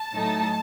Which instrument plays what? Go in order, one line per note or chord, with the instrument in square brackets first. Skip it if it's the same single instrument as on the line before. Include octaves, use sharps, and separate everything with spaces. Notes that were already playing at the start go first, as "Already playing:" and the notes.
Already playing: [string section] A5
A2 F#3 A3 D#4